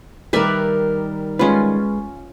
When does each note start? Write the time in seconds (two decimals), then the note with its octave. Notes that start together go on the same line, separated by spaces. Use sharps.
0.33 D#3 G3 A#4 B4 D5 E5
1.39 G#3 C#4 F4 B4